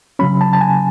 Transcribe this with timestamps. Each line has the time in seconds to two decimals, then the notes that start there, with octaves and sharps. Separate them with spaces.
0.19 C#3 F#3 C#4 B5
0.41 A5
0.53 A5
0.61 G#5